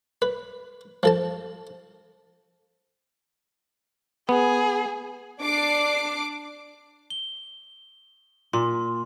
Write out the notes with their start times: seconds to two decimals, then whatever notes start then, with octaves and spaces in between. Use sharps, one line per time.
0.22 B4
1.03 F3 A4 A5
4.29 B3 G#4
5.42 D4 D6 C7
7.10 G7
8.53 A#2 C6